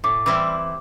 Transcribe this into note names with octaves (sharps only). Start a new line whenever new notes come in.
A2 D6
E3 G3 C4 E4 D6